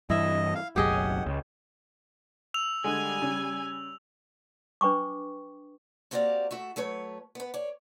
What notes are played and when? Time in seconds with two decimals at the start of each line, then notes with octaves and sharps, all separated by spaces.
0.10 G2 E3 E4 D#5 E5
0.55 F5
0.76 F#1 B1 F#2 G4 G#4 D#5 F#5
0.93 C#4
1.26 C#2
2.54 E6 F7
2.84 D3 G3 G#3 G#5
3.22 C#3
4.81 D4 B4 G5 C#6 D6
6.11 A#3 C4 F#4 G4 D5 F5
6.51 A3 F#4 E5
6.76 F#3 A3 B4 C#5
7.35 B3 B4
7.54 C#5 D5